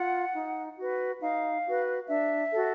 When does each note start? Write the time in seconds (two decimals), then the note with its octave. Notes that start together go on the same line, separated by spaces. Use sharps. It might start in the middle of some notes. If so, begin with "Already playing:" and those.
Already playing: F4 F#5
0.33 D#4
0.77 F#4 B4
1.20 D#4 F5
1.64 F#4 B4
2.07 D4 E5
2.51 F#4 A4